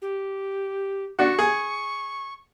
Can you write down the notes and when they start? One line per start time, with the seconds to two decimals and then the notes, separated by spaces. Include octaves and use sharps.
0.02 G4
1.19 D4 F#4 C#6
1.39 G#4